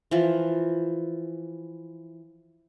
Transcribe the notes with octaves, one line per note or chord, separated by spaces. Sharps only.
E3 F3